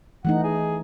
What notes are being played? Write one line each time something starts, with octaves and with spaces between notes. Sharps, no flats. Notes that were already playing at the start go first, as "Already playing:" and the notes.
E3 A3 D#4 F#5
G#4